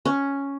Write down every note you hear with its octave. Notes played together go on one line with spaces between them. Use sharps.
C#4